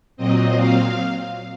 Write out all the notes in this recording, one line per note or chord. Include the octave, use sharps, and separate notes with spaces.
A#2 F#3 C4 D#5
F5